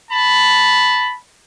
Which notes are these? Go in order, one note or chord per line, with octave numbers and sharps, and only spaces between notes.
A5 B5